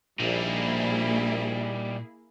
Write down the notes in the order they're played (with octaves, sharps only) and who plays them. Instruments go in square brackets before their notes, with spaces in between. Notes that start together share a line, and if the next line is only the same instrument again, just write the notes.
[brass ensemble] A#1 [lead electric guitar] A#2 [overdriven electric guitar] G3 D#4 [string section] A#3 E4 G#4